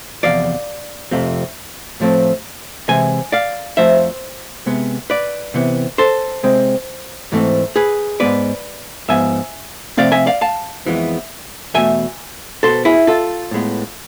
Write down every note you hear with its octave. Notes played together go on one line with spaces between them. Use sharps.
E2 C3 F3 D5 F5
F2 C3 F3 A3 C4
A2 F3 A3 C4
C3 E3 G#3 G#5
D5 F5
F2 C3 F3 A3 C5 E5
C3 G#3 B3
B4 D5
C3 E3 B3
A4 C5
C3 G#3 C4
G#2 E3 A3 C4
G#4 B4
G#2 G#3 B3 B4 D5
G#2 F3 B3 E5 G#5
C3 F3 A3 C4 D5 F5
E5 G#5
D5 F5
F5 A5
F2 E3 G#3 B3
E2 B2 A3 E5 G#5
B2 B3 A4 C5
E4 G#4
F4 A4
A2 G#3 B3